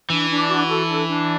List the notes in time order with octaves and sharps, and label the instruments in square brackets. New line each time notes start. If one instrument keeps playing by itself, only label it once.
[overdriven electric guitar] E3 [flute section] D4
[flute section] D4
F#4
A4
D4
D4